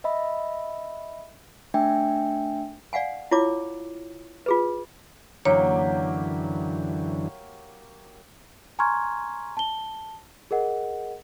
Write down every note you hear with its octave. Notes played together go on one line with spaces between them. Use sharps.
D#5 E5 B5
A3 D4 E5 G5 G#5
D5 F5 F#5 G#5
E4 F4 C#5 D6
F4 G#4 B4
F#2 D3 E3 F#3 A#3 G4 C#5
G#5 A#5 C6 C#6 F6 G#6
A5 G7
G#4 A#4 D#5 F#5